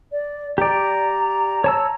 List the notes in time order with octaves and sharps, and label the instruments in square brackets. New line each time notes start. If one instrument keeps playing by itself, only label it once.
[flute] D5
[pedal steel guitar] G4 D5 [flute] A#5
[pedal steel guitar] C#5 A5 E6